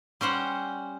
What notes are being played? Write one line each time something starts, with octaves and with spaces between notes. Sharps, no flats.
G3 C#4 C5 F#5